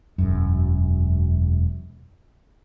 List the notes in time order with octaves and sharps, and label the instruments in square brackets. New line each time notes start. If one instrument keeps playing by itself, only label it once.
[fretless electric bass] E1 F#2